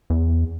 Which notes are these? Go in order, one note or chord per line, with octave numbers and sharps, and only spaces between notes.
E2